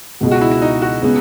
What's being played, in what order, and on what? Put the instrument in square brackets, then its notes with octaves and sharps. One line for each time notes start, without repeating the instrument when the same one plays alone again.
[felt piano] C#2 B2 G#3
[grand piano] F#4
E4
E4
D#4
F#4
[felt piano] C#3 G#3 B3